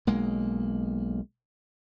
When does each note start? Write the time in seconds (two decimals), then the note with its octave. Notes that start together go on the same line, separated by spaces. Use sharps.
0.07 B1 G#3 A#3